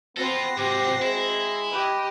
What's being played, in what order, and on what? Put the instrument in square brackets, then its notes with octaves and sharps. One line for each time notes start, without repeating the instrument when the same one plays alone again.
[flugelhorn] B3 [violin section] C4 F#4 C5 [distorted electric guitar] F4 A4 [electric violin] A#6 C7
[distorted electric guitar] G#2 C3 [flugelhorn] G4
[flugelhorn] G#3 [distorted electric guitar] E4
[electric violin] G4 D#5 [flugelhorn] B4